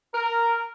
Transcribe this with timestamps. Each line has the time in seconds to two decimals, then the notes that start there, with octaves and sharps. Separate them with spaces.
0.13 A#4